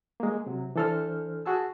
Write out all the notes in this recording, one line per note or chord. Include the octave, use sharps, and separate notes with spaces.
G#3 A#3
C3 F#3
E3 D4 A4 C5 F6
F#4 G#4 A5 E6